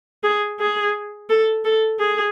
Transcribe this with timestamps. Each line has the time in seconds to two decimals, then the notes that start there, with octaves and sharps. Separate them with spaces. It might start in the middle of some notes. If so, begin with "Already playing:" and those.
0.24 G#4
0.60 G#4
1.30 A4
1.65 A4
1.99 G#4